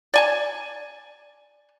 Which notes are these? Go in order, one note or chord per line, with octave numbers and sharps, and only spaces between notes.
D5 G#5 A5